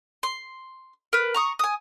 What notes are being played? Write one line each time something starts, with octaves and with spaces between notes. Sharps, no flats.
C6
A#4 B4
A#5 C#6 D#6
G#5 D#6